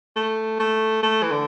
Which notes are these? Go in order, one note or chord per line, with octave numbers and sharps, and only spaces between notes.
A3
A3
A3
E3
D3